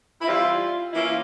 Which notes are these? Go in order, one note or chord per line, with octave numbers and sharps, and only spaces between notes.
E4
E3 G3 C4 F4
E3 A#3 C#4 E4
F4